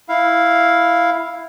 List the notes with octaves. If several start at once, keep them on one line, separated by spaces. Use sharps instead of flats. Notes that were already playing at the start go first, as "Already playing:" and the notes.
E4 F5